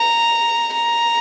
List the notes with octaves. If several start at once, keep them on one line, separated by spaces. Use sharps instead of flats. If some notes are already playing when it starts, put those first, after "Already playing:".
Already playing: A#5
A#5